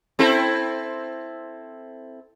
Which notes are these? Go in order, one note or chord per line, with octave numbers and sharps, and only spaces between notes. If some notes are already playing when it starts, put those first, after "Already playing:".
C4 E4 A4